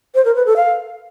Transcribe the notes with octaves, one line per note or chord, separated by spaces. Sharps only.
C5
A#4
B4
A4
F5